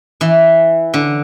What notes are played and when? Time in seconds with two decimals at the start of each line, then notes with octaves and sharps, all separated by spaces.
0.21 E3
0.94 D3